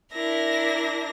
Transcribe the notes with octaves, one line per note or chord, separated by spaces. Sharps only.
D4 E4 A#4 A#6